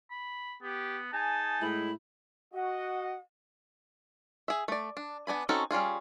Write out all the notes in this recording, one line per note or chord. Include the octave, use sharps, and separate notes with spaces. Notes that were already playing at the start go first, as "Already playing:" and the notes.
B5
B3 G4
D#4 G#4 G#5 A5
A2 G#3 E4
F#4 D#5 F#5
G#4 E5
A3 D5
D4
B3 D4 G#5 B5
C4 C#4 D#4 F#4 A4
G3 C#4 F4 G#4